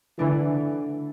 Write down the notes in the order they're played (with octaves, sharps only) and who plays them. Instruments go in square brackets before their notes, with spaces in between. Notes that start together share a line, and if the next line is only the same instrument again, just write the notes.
[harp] D3 A3 D4 [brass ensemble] E3